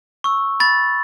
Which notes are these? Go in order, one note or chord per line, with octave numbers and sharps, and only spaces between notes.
C#6 E6
B5 A6